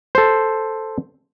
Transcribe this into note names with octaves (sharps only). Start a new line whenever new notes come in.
A4 C5